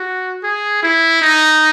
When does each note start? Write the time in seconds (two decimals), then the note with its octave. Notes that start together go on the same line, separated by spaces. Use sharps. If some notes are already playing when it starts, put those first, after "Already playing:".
Already playing: F#4
0.43 G#4
0.83 E4
1.22 D#4